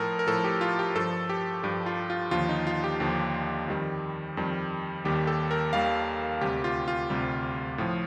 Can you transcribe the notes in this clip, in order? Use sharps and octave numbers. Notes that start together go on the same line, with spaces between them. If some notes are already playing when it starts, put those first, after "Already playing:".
Already playing: A2 F3 A4 A#4
A#4
A2 F3 A4
G4
F4
G4
G2 F3 A4
G4
G2 F3 G4
F4
F4
D#2 D3 F3 F4
D#4
F4
G4
D#2 D3 F3
F2 D#3 G3
F2 D#3 G3
D#2 D#3 G3 G4
A4
A#4
D#2 D#3 G3 F5
D2 C3 G3 G4
F4
F4
D2 C3 G3
A2 F3